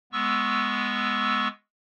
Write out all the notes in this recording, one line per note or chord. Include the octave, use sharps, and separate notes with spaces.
G#3 B3 C#6 E6